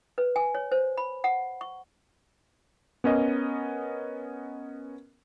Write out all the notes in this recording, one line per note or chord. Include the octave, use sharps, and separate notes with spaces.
B4
G#5
C#5
C5
B5
F#5
C#6
B3 C#4 A#4 D#5